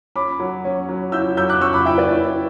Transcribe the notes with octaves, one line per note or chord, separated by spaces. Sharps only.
C#4 B5 D6
F#3
C#4
F#3
E4 E6 G6
F#3 E6 G6
D6 F#6
C#4 C#6 E6
B5 D6
E4 E5 G5
B4 D5
E4